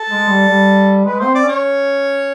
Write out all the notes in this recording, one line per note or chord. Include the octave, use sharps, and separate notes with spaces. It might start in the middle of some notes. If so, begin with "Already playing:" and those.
Already playing: A4
G#3
G3
G3
G#3 B4
C4 C5
D5
C#4 C#5